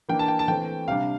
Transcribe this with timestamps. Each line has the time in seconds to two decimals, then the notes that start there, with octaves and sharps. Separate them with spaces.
0.09 E3 A#3 D4 G5
0.19 A5
0.28 G5
0.39 A5
0.48 E3 A3 C4 G5
0.88 C3 G3 D4 F5